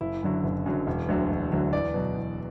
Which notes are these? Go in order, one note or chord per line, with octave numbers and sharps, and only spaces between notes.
F#1 E4
F#2 D3 F#3
F#1
F#2 D3 F#3
E1
D2 D3 F#3
E1
D2 D3 F#3
E2 D5
B2 F#3
E2